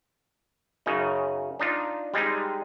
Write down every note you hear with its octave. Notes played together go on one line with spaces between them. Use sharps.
F#2 C#3 D#4
D4 D#4 F4
G3 G#3 C4 D#4